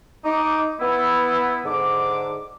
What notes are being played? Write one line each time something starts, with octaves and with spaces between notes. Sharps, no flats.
D#4 D6
B3 E4
G#2 D3 D6